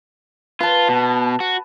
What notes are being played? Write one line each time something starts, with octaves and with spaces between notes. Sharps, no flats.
F4 B4 A5
B2
F#4